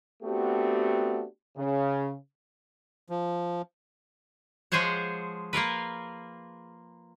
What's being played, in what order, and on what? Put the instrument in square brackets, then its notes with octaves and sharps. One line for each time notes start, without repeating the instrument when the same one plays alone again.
[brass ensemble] A3 B3 C4 D4 F#4 G4
C#3
[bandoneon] F3
[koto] F3 G#3 G#4 C5 C#5 F#5
A#3 F4 A#4 B4